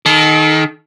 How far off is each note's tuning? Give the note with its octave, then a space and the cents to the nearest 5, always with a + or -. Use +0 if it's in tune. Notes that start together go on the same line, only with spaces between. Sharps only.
D#3 +0 A4 -35